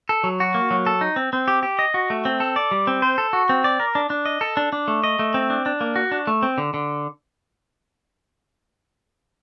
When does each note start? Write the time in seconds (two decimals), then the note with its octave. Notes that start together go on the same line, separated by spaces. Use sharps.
0.09 A4
0.24 F#3
0.40 F#4
0.54 A#3
0.71 F#3
0.87 A4
1.01 D#4
1.16 C4
1.33 C4
1.48 G4
1.63 G4
1.79 D#5
1.94 F#4
2.10 A3
2.25 C4
2.40 A4
2.56 D5
2.71 G3
2.87 C4
3.02 C5
3.18 A4
3.33 F#4
3.49 C4
3.64 D5
3.80 A#4
3.95 D4
4.10 D4
4.26 D#5
4.41 A4
4.57 D4
4.73 D4
4.88 A3
5.04 D#5
5.19 A3
5.34 C4
5.50 D4
5.66 D4
5.81 A#3
5.96 F#4
6.12 D4
6.27 A3
6.43 C4
6.58 D3
6.74 D3